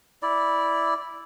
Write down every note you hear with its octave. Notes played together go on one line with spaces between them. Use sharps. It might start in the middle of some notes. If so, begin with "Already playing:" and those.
E4 D5